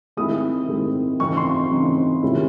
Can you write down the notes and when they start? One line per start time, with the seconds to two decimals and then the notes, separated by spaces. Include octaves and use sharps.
0.17 D#3 G#3 C4 E4 D#6
0.68 D#3 G#3 C4 E4
1.20 C#3 E3 C4 D#4 C#6
1.37 C6
1.71 C#3 E3 C4 D#4
2.22 C3 D#3 G#3 C#4 E4